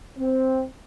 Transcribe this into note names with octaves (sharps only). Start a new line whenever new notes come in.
C4